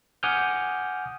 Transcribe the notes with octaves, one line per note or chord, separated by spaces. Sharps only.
F#5 G#5 D6 D#6 F6 G6